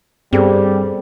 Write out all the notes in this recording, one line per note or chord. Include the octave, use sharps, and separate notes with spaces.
G2 G3 B3 C4 G#4 A4